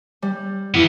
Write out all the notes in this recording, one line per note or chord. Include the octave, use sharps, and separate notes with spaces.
G3
E3 B3 E4